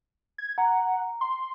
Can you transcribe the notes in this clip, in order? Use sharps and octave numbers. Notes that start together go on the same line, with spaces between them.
G#6
F#5 A#5
C6